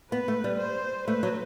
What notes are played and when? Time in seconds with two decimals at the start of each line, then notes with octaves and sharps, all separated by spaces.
0.12 B3 B4
0.28 A3
0.44 G3
0.60 C5
1.07 A3 B4
1.23 F#3